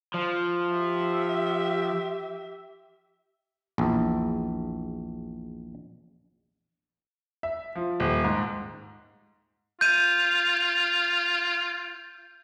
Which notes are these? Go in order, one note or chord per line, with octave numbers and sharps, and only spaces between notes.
F3
G4 E5
A#1 E2
E5
F3
D#1
G#2
F4 G6 D#7